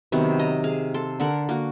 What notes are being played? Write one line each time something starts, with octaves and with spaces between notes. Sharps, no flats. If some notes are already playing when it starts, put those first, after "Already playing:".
C3 D#3 F#3 B3
D#5 A#5
G#4 F5
A4 C6
D3 A4 A#4 F#5
A#3 F#4